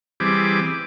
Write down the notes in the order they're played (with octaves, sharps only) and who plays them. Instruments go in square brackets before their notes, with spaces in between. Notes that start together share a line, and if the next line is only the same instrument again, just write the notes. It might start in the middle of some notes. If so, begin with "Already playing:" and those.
[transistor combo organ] E3 G3 C4 G#4 D6